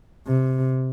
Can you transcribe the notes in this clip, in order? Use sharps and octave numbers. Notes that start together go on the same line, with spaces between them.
C3